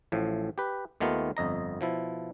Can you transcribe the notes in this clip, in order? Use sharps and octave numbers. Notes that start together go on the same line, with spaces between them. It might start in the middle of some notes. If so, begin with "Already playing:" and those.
A1 A2 F3
G4 B4
D#2 D#3 A3 B3 F4
G1 F2 D#5 A#5
B2 F3 E4